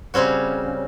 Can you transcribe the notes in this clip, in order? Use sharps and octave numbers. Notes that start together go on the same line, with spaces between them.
C#3 G3 C4 C#4 F#4